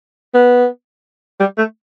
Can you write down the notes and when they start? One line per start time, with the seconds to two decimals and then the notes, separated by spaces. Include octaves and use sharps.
0.34 B3
1.40 G3
1.58 A3